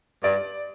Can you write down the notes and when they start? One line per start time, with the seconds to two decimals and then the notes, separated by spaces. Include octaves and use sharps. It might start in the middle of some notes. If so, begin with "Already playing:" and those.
0.23 G2 D5